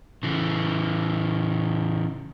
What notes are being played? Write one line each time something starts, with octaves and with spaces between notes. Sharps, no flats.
C#3 E3